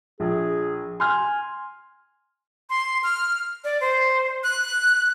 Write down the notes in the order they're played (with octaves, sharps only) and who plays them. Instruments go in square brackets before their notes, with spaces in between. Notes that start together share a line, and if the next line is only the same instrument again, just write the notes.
[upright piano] A#1 [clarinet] G#4
[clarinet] G#5 [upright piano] C6 F6
[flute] C6
F6
D5
C5
F#6